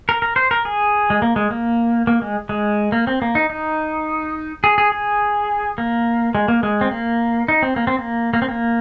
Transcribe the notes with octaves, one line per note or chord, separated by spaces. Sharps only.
A#4
A#4
C5
A#4
G#4
G#3
A#3
G#3
A#3
A#3
G#3
G#3
A#3
C4
A#3
D#4
D#4
G#4
G#4
G#4
A#3
G#3
A#3
G#3
C4
A#3
D#4
C4
A#3
C4
A#3
A#3
C4
A#3